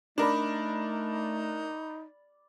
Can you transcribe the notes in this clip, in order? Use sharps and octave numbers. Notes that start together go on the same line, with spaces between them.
A3 D4 D#4 A#4 D5 B5